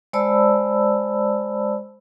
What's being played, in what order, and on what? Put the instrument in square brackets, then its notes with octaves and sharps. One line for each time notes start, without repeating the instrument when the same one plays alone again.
[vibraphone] G#3 C5 D5 A5 B5 E6